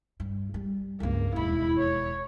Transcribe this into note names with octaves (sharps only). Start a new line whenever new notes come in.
G2
G3
C#2 G2 A#3
E1 D#2 E4 B5
C#5